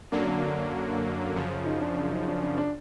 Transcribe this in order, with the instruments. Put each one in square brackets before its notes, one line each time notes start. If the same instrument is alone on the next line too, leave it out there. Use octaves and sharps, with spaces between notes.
[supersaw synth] F#2 D3 F#3 A#3 [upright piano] D4
[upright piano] D4
D4
[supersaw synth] F#2 C#3 F3
[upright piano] D#4
D4
D4
D#4
D4
D4
D4